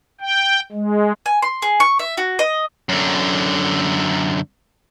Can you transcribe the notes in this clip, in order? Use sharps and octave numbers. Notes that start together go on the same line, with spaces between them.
G5
G#3
G#5
C6
G#4
C#6
E5
F#4
D#5
F#2 D3